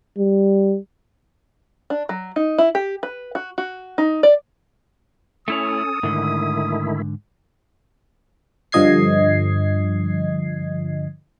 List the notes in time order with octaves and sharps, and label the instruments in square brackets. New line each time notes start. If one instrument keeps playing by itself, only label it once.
[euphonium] G3
[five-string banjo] D4
F#3
D#4
E4
G4
B4
F#4
F#4
D#4
D5
[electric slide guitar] A3 E4 C#5 [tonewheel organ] C#4 A4 [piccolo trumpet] D#6
[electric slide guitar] G#2 D3 [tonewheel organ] D#3 A3 E4
[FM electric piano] G2 D3 F3 D#5 G#6 C7